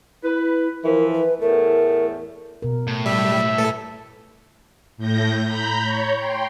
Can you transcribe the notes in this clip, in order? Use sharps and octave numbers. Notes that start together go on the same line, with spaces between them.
E4 B4
E3 F3 A#4
B4
E2 A2 A3 A#4
B2 A#4
A2
G3 E5
A3 A4 B4
A2 G6 A#6
A#5 B5 G6
C#5
G5 C6